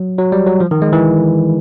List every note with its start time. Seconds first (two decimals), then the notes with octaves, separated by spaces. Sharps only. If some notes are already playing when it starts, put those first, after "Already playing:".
Already playing: F#3
0.18 F#3
0.32 G3
0.47 F#3
0.60 F3
0.71 D#3
0.82 G#3
0.93 E3